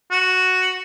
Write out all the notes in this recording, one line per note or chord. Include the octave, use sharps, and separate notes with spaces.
F#4